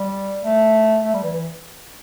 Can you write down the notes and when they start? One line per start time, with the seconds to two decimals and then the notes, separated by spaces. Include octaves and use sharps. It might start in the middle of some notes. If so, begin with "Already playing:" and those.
Already playing: G3
0.44 A3
1.05 A3
1.14 G3
1.24 E3
1.34 E3